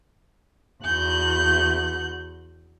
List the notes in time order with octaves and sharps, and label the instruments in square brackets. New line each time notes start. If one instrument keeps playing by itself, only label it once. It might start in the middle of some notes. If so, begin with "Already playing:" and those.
[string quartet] E2 F#4 F#6 G6